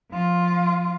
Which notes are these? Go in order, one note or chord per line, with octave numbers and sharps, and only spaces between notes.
F3 F4